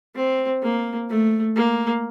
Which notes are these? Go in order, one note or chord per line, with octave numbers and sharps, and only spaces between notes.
C4
A#3
A3
A#3